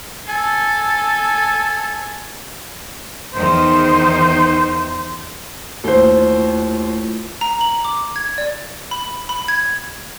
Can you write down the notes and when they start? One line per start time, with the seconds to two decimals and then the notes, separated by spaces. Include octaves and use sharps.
0.27 A4 G#5
3.33 E2 D#3 D#4 C5
5.84 D#2 A3 E4 F4 C5
7.41 A#5
7.61 F#7
7.85 D6
8.16 G#6
8.38 D5
8.91 B5
9.29 B5
9.48 G#6